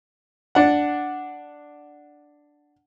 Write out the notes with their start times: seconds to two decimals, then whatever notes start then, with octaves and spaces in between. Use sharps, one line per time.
0.55 D4 F#5